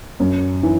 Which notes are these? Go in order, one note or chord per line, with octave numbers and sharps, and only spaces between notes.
F#2
E3